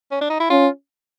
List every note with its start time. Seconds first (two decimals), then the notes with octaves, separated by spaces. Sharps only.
0.11 C#4
0.21 D4
0.30 D#4
0.40 E4
0.50 C#4 F4